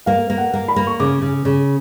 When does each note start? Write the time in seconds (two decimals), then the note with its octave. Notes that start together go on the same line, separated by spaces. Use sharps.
0.06 A#3 F5
0.30 A#3
0.38 F#5
0.54 A#3
0.68 B5
0.76 A#3
0.87 C#6
1.00 C#3 D6
1.22 C#3
1.45 C#3